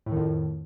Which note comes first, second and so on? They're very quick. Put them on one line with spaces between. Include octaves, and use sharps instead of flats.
A2 D#3 F2